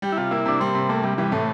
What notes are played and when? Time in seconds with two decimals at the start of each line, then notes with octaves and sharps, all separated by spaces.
0.02 G3 G4
0.12 E4
0.17 C3 F4
0.31 A#3 E4
0.46 C3 D4
0.60 G3 C4
0.75 C3
0.89 A3 A#3
1.03 C3 G3
1.18 E3 G3
1.32 A2 A3